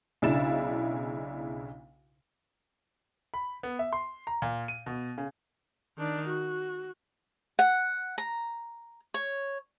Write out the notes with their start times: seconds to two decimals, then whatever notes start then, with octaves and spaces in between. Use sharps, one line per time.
0.22 B1 C#3 D4 E4 A6 E7
3.34 B5
3.63 B3
3.79 E5
3.93 C6
4.27 A#5
4.42 A#2
4.68 D#7
4.86 B2
5.18 C#3
5.98 D#3 D4
6.28 F#4
7.59 F#5
8.18 A#5
9.14 C#5